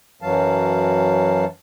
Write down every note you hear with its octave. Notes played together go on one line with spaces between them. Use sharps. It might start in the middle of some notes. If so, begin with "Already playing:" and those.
F#2 E3 F#3 F5 A5